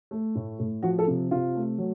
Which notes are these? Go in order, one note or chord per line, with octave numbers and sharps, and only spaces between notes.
A3
A2
A2
F3 F#4
A4
C3
C3 F4
A3
F#3